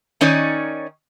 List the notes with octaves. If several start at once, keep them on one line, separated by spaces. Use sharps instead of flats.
D#3 C#4 D#4 C#5 D5